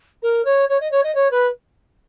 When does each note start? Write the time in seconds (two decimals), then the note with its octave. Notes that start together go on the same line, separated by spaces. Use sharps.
0.23 A#4
0.45 C#5
0.69 C#5
0.81 D#5
0.91 C#5
1.04 D#5
1.15 C#5
1.31 B4